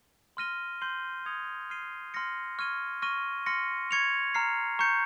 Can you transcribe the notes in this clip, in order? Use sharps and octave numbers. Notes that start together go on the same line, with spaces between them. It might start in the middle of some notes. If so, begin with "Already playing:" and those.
C6 F6 A#6 D#7 G7
C6 G6 C7 G7
D#6 G#6 C#7 F7
F6 C7 D#7 G7
C6 F6 A#6 C#7
C#6 F6 G#6 D#7 G7
C#6 F6 A#6 D#7 G7
C6 F6 A#6 C#7
C#6 G#6 C#7 F7
A#5 F6 C7
A#5 C#6 G6 C#7